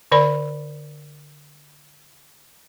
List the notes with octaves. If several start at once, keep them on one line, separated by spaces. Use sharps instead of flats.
D3 A#4 D5 B5